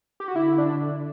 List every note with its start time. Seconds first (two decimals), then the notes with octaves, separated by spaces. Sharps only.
0.20 G4
0.28 F#4
0.36 D3 E4
0.58 D4